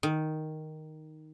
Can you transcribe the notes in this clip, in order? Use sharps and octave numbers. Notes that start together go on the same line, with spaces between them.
D#3